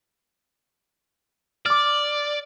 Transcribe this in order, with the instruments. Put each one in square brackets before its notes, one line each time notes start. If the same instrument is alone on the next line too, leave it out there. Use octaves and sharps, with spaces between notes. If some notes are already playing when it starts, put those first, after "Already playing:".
[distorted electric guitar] D5 [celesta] D6 F6